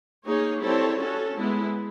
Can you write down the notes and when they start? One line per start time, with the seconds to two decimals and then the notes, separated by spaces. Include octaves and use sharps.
0.25 A#3 D#4 G#4 C#5
0.62 G3 C4 E4 A4 C#5
0.99 C#4 F#4 A4
1.36 G#3 B3 E4